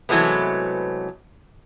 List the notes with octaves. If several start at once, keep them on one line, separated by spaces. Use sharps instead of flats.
C3 E3 F#3 G#3 A3 B3